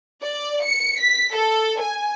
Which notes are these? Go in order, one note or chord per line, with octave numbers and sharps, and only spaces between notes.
D5
C#7
B6
A4
G#5